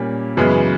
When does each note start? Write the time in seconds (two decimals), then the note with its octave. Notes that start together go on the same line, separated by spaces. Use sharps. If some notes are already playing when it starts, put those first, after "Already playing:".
Already playing: A#2 G3 A#3 C#4
0.37 F#2 C#3 E3 G#3 B3